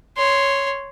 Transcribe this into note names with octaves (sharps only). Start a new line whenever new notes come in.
C#5 C6